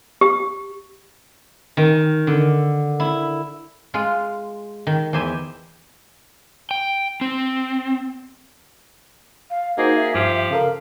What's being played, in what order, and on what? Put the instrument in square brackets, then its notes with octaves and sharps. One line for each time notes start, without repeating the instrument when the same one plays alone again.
[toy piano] G4
[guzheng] D#3
D3
E4
G#3 F4
D#3
E2 G4 C5 E5 G#5
[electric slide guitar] G5
C4
[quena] F5
[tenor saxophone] A#3 [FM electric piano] D#4 F#4 [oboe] G#4 [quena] C5
[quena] E5
[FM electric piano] G2 [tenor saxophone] F3 [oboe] G4
[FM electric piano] C#3 A4 A#4 [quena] F5